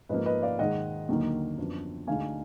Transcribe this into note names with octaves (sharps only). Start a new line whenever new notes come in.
G#2 F3 A#3 B4 D#5
B4 D#5
D5 F5
G#2 D#3 G#3 D#5 F#5
D#2 D3 F#3 A#3 D#4
F#2 F3 B3 D4
D2 D3 G#3 D#4 F5 G#5